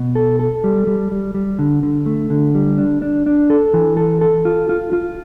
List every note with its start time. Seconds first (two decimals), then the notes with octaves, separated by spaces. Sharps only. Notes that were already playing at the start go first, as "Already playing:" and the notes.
Already playing: B2
0.15 A4
0.39 A4
0.64 G3
0.87 G3
1.11 G3
1.34 G3
1.59 D3
1.83 D3
2.06 A3
2.30 D3
2.55 G3
2.78 D4
3.02 D4
3.26 D4
3.50 A4
3.74 E3
3.97 A4
4.21 A4
4.45 F4
4.69 F4
4.93 F4